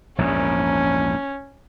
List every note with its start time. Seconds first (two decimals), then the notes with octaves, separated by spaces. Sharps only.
0.18 A#1 E2 G#2 C#4